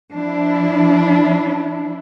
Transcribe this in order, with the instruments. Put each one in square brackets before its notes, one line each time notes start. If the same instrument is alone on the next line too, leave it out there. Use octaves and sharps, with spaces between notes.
[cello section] F3 D4 E4